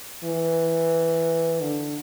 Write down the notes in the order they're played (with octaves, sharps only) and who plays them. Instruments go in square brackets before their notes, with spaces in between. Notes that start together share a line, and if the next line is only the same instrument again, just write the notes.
[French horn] E3
D3